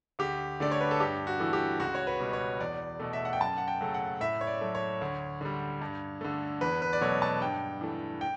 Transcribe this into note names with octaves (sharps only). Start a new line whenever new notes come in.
D2 G4
D3 A3 D5
C#5
B4
A4
G2 G4
F#4
E3 A3
G4
C#2 F#4
C#5
B4
B2 G3
C#5
E2 D5
B2 A3
E5
F#5
G5
F#2 A5
F#5
G5
C#3 F#3 A3
F#5
A2 E5
C#5
D5
F#3 A3
C#5
D2
D3 G3
G2
D3 A3
E2 B4
B4
D5
B2 F#3 A3 C#5
A5
G2 G5
E3 A3
G5